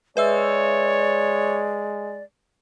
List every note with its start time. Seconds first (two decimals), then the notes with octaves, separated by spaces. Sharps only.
0.17 G#3 B4 C#5 D5 E5 E6